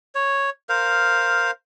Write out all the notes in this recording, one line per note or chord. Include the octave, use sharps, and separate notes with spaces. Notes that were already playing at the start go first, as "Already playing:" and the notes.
C#5
A#4 C5 F5